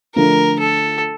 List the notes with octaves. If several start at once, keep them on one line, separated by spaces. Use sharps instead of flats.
D3 F3 A3 D4 A#4
A4